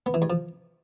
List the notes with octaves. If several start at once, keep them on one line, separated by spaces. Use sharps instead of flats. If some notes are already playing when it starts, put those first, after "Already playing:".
B3
E3
G2
F3